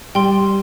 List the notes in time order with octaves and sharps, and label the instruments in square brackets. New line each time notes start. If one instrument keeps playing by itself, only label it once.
[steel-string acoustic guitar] G3 [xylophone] G5 C6